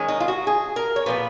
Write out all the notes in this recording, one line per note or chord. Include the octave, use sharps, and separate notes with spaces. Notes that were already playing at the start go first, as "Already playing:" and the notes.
Already playing: D#3 G#3 C#4
D#4
F4
F#4
G#4
A#4
C#5
A#2 F3 B3 B4